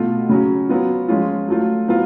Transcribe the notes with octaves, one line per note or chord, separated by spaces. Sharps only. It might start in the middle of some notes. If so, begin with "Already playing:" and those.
Already playing: B2 A3 F4
C#3 F#3 C#4
F#3 B3 F4
F3 G#3 C#4 F4
F#3 A3 F4
F#3 B3 F4